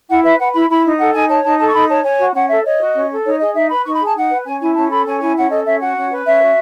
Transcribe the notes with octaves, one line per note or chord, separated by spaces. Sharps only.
E4 F#5
B4 E5
B4 F#5
E4 B5
E4 B5
D#4
A4 F#5
D#4 G#5
C#5 A5
D#4 A5
A4 A5
C#6
D#4 B5
C#5 A5
C#5 G#5
F#4
C#4 F#5
A4 E5
C#5 D#5
F#4
C#4
A4
D#4 C#5
G#4 D#5
D#4 E5
B4 B5
D#4 C#6
B5
G#4
A5
D#4 F#5
B4
C#4 G#5
E4 G#5
C#4 A5
A4 B5
C#4 G#5
E4 G#5
C#4 F#5
A4 D#5
C#4 E5
F#4 F#5
C#4
B4
C#4 E5
F#4